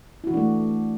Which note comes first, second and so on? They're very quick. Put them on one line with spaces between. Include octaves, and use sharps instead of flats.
E4 F#4 E3 D4 A3